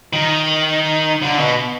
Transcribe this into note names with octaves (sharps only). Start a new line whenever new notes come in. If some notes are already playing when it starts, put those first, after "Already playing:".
D#3
D3
B2